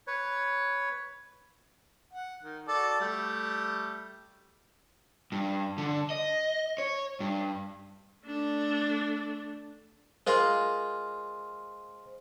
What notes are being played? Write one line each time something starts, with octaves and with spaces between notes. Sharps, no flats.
B4 C#5
F#5
D#3
F#4 A4 D5
G3 A3
G2
D3
D#5
C#5
G2
A3 D4
G#3 F4 A#4 C5 C6